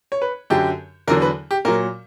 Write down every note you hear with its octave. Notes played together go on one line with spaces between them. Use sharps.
C#5
B4
F#2 D3 F#3 G4
E2 D3 F#3 A#4
B4
G4
A#2 F#3 A#4